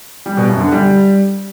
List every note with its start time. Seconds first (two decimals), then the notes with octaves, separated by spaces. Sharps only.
0.26 G3
0.37 B2
0.49 F#2
0.60 D3
0.72 G3